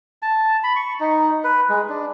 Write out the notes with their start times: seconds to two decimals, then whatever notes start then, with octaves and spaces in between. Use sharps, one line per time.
0.22 A5
0.64 B5
0.76 C#6
1.00 D#4
1.44 B4
1.69 G#3
1.89 D4